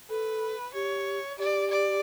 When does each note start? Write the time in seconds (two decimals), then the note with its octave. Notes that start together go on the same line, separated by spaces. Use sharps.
0.10 A4 B4
0.74 G4 C#5
1.38 G4 D5
1.70 D5